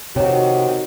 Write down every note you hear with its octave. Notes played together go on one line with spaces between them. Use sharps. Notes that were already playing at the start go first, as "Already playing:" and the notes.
C3 D#3 F3 F#4 G4 C#5 G5